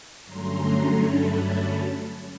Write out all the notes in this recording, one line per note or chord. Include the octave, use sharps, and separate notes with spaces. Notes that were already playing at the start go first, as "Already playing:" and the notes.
G2 D3 F#3 A3 C#4 A#5 C6
A5 B5